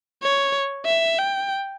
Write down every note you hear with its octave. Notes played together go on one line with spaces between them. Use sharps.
C#5
E5
G5